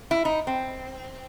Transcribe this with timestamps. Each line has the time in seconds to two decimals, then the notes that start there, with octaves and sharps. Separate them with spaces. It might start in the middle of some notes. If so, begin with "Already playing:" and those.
0.11 E4
0.25 D#4
0.47 C4